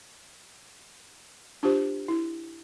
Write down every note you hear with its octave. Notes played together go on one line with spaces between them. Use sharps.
D4 F4 G4 C5
E4